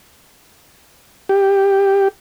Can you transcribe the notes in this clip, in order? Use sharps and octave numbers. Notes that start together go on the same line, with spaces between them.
G4